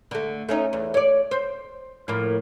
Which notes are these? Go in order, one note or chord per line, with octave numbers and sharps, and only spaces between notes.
D3 A3
A3 C#4 D#4
E2
C#5 D5
C5
A2 F3 A#3